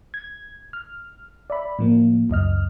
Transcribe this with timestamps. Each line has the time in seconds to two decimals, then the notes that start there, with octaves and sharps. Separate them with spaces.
0.14 G#6
0.73 F6
1.50 D5 E5 B5
1.79 A2 F3 A#3
2.30 C#2 F#2 D#5 F6